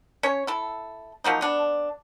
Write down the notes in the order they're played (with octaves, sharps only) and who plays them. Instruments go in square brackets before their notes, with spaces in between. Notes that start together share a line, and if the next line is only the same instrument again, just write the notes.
[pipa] C#4 C#5
E4 A4
F3 F#3 A#3 D#4
B3 D4